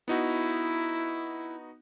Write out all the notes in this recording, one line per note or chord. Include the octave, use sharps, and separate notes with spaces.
B3 D#4 E4 F#4